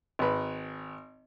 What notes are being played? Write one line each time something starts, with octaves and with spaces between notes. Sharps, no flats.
G#1 B4